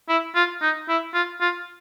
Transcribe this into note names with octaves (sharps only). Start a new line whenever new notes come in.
E4
F4
D#4
E4
F4
F4